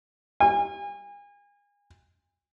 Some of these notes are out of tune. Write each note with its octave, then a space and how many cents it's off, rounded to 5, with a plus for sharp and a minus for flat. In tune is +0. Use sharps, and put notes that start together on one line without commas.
G#5 -35